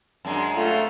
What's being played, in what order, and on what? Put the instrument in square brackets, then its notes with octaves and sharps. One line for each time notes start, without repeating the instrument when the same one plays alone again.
[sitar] F#2 G#3 D4
[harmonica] A3 F4